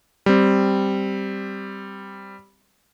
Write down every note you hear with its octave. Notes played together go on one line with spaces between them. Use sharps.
G3 C4